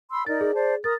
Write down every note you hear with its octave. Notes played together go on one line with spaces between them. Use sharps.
B5 C6 E6
D#4 A#4 D5 A6
G#4
C5 D5 A5
A#4 D#6 A6